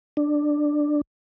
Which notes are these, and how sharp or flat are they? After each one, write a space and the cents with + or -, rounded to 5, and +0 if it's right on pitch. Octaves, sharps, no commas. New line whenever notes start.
D4 +10